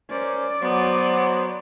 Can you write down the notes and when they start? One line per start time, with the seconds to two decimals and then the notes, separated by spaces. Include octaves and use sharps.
0.10 C#4 A#4 C5 D5
0.62 F#3 B3 C5